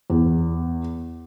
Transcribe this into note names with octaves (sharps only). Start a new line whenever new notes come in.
E2